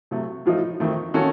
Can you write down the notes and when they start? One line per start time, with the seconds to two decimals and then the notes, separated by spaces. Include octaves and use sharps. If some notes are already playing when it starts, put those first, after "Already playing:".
0.11 C3 F#3 A3
0.45 A2 F3 A3 D#4
0.80 F2 D#3 A3 C4
1.14 D#3 A#3 C#4 F#4 A4